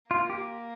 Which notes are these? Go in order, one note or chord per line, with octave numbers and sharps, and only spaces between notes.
A#3 F4
G4